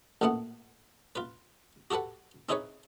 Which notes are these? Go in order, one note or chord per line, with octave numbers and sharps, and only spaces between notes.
A1 A#2 A3 B3 E4 F#5
F4 B4
F#4 G4 A4 B4 F#5
C4 D#4 E4 G#4 B4 C#5